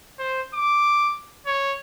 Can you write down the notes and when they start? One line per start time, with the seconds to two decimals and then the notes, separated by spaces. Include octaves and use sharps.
0.19 C5
0.54 D6
1.46 C#5